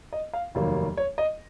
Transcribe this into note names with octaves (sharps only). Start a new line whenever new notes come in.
D#5
F5
F1 D#2 D#3 F#3 A#3
C#5
D#5